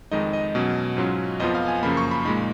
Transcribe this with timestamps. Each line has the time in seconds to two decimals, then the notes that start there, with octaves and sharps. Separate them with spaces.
0.11 F2 D#3 G#3 D#4 D#5
0.33 D#5
0.55 B2 F#3 C#4
0.97 G#2 F#3 C#4 F4
1.40 F2 F3 B3 F4 D#5
1.55 F5
1.68 G#5
1.83 F#2 C#3 F3 A#3 B5
1.97 C#6
2.11 B5
2.25 A#2 G#3 D#4 B5